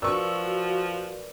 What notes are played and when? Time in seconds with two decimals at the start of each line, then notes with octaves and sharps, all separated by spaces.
0.02 F3 F#4 A#4 B4 D5 C#6 E6